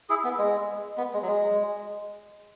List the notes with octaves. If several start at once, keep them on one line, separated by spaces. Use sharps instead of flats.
E4 G#4
B3
G#3
B3
G#3
F#3
G#3